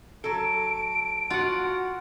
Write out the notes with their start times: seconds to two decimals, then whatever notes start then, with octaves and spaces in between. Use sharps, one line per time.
0.24 F#3 A4 D7
1.30 F4 F#4 F#5